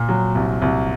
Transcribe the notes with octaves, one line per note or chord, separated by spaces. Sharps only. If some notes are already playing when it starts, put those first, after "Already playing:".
Already playing: A#2
F#3
C2
C2